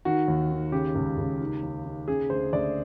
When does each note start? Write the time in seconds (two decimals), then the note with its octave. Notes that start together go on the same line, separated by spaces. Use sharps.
0.05 D#3 F#4
0.28 D#2
0.50 D#3
0.72 C#3 G4
0.95 C#2
1.17 C#2
1.40 D#3
1.63 D#2
1.85 D#3
2.08 C#3 G#4
2.30 D2 C5
2.53 D2 D5